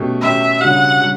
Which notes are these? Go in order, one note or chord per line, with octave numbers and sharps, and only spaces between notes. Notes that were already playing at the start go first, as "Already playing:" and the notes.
Already playing: B2 A3 C#4 G4
B2 A3 C#4 G4 E5
C#3 G3 D4 F#4 F#5
C#3 G3